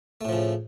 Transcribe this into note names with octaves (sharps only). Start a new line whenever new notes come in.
A2 C#3 F3 A3